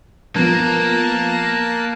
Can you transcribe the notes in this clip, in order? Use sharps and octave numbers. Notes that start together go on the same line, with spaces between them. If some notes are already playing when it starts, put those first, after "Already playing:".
F3 A#3 B3 A#4 A5 F#6